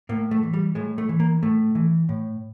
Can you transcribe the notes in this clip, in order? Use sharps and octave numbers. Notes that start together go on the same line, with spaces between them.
A2 A#3
A3
E3
G3
A2 G#3
A3
E3
A#3
A2 A3
E3
A2